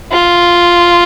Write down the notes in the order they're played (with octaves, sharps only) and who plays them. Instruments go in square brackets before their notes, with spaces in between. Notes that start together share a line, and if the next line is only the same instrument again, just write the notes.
[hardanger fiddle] F4